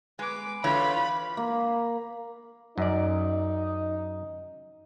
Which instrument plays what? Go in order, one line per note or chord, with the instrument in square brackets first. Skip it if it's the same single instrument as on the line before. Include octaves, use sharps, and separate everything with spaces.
[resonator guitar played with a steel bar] G#3 [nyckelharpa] B4 D6
[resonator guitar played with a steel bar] D3 E3 C#5 [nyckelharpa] F4 B4 [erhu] B5
[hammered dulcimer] A#3
[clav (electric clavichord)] F#2 D5 [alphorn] D#4